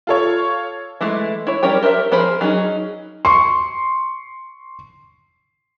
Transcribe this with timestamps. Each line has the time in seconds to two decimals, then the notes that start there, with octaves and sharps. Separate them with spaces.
0.07 F4 A4 C#5
1.01 E3 G#3 A3 E4
1.47 E4 C#5
1.63 G3 C#4 A#4 C#5 G5
1.83 G4 A#4 C5 E5
2.12 F3 G#4 A#4 C5 B5
2.41 F#3 C#4 D#4 G#4
3.25 C6 C#6